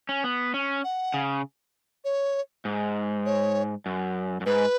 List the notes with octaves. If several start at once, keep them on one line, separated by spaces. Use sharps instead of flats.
C#4
B3
C#4
F#5
C#3
C#5
G#2
C#5
F#2
F#2
G#2 B4